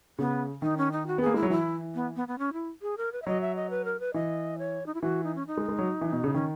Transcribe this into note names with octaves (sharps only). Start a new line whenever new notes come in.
C#3 B3
D#3 D#4
C#4
D#4
F#4
B3 G#4
A#3
G#3 E4
F#3
E3 E4
B3
B3
B3
C#4
E4
G#4
A#4
B4
E5
F#3 D#5
E5
D#5
B4
A#4
B4
E3 D#5
C#5
D#4
E4
E3 F#4
D#4
C#4
D#4
G#3
G#3
F#3
E3
B2
C#3
D#3 C#4